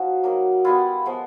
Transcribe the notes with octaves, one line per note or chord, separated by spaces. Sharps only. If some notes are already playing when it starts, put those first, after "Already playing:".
Already playing: F3 C#4 D#4 F#4
F#3 A#3 D#4
G3 B3 E4 F4
F3 G#3 B3